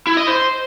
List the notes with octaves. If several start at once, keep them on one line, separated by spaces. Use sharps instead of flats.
E4
D#5
C5